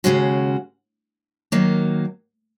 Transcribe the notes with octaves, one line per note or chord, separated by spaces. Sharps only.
D#2 C#3 G#3 C#4 F#4
D#3 F#3 A#3